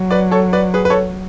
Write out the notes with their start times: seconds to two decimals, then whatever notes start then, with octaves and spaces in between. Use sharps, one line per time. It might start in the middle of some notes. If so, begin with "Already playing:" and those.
Already playing: F#3
0.11 B4 D5
0.31 A4 C#5
0.53 B4 D5
0.74 G#4 B4
0.85 B4
0.90 A4 C#5